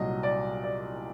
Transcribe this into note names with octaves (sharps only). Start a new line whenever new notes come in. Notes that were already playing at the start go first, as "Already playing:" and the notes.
Already playing: C2 A#2 F#3 D#5
D5
D5